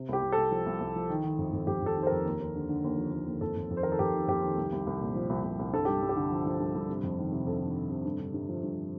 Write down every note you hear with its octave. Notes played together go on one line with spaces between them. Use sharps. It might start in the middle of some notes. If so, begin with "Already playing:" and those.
Already playing: C3
C2 G4
C2
A4
C2
F3
C2
C2
F3
D#3
D#3
F2
F2
F2 G4
F2 A4
D#3
C5
F2 A#4
D#2
D#2
D3
D3
D#2
F3
D#2
D#2
F2 A4
F2
F2
C5
D#3 A#4
A4
F2 G4
D#3
F2 G4
D#3
C2
C2
C2
A#2
F3
C2
C2
C2
G2 A4
G2 G4
G2
G4
D3
F3
F3
G2
G2
C3
F2
D#3
C3
F2 A4
D#3
C3
C3
G2
D3
G2
F3
G2